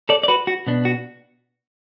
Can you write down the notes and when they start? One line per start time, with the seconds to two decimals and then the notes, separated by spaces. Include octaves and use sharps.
0.09 A4 D5
0.23 D5
0.28 F#4 B4
0.47 F#4
0.67 B2 B3 D4
0.85 F#4